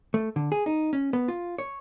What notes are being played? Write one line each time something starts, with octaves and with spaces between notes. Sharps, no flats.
A3
D3
G#4
D#4
C#4
B3
F4
C#5